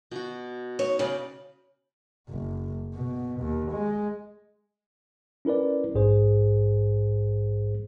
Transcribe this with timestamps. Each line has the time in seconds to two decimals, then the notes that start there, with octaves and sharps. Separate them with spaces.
0.11 B2 F#4
0.79 D#4 C#5
0.99 C#3 B4 D5 G5
2.29 F#1
2.94 B2
3.41 D#2
3.72 G#3
5.45 C#4 E4 A#4 B4 D5
5.94 A#1 G#2 G#4 C5